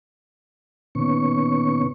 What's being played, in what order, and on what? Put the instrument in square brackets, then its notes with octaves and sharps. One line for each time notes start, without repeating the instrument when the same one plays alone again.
[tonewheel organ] A#2 D#3 B3 C#4 C#6